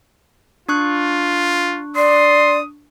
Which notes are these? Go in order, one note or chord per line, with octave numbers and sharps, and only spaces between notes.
D4 F4 C#6 F#6
D5 C6 D#6